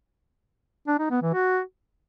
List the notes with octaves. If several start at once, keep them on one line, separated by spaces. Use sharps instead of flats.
D4
D#4
B3
E3
F#4